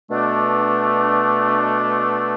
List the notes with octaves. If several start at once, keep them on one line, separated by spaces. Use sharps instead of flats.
B2 A3 D4